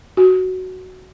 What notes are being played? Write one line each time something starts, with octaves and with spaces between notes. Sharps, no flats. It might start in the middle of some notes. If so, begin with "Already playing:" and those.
F#4